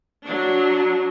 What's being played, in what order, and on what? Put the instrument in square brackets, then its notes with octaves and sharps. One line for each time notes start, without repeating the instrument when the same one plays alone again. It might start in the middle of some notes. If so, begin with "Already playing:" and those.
[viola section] F#3 D4